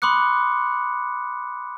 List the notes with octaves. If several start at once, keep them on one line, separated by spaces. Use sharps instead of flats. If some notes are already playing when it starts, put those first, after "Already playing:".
B5 C6 D6 D#6 F#6 C#7